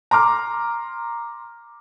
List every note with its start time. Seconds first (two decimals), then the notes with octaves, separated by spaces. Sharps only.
0.11 A#5 C6 D6 F6